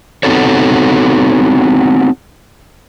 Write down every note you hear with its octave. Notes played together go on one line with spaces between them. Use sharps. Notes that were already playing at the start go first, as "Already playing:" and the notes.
B3 C4 D#4 F#4 A4 C#5